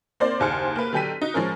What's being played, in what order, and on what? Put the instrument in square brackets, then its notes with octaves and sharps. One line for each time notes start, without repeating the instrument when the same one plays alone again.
[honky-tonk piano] A#3 C4 C5 D5
F#1 D#2 G#4 C5 F6 C#7
A#3 B4
D3 F#3 G4 G5 B6 D#7
D#4 F#4
F3 G#3 C#4 A#4